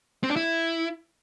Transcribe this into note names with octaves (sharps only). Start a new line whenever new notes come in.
C4
D4
E4